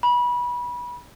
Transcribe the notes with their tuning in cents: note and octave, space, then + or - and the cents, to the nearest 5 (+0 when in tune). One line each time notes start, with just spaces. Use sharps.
B5 -25